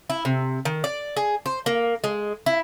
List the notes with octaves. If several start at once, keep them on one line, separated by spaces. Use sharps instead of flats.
E4
C3
D#3
D5
G#4
C5
A#3
G#3
E4